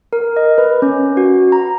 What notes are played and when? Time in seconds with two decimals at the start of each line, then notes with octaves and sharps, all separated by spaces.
0.13 A#4
0.37 D#5
0.58 B4
0.82 C#4
1.17 F#4
1.52 A#5